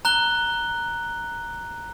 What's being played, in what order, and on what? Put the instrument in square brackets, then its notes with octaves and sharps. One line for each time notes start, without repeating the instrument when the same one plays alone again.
[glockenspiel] A#5 F#6 G7